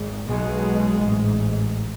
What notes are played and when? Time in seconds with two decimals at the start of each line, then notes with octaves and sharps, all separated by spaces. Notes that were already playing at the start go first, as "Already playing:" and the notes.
Already playing: G#1 G#2
0.26 B1 B2 G#3
1.00 A1 G#2